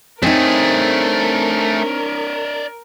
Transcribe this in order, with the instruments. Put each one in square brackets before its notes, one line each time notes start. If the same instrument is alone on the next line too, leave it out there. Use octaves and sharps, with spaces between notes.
[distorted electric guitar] A3 G#4 [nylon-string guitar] C4 D#4 [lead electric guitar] D4 C#5 [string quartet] A#4